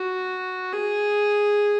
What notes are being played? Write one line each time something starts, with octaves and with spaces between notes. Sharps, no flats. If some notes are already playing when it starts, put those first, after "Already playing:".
Already playing: F#4
G#4